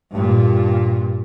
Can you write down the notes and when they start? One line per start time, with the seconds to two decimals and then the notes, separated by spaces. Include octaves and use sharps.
0.11 G2 A#2